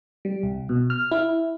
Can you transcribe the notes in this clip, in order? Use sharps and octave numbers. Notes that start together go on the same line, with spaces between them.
G3
C2
B2
F6
E4